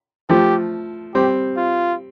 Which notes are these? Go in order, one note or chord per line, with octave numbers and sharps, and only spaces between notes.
F3 A3 G4
G3 C4 G4
F4